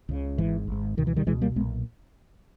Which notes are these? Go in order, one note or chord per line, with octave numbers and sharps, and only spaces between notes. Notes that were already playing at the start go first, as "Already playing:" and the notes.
C#2 C#3
G#1 G#2 E3
G#1 G#2
C#2 B2 D#3
E3
D#3 G3
C#2 B2 E3 G#3
G3 A#3
B1 A#2 G#3 B3